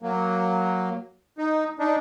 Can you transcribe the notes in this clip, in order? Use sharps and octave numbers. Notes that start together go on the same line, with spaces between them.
F#3 A#3
D#4
D4 D#4